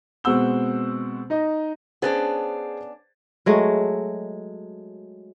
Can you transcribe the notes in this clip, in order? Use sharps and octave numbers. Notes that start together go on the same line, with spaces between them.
B2 G#3 C4 F#5 E6 G7
D#4 D#5
B3 C#4 D4 G#4 C5 A6
F#3 G#3 A3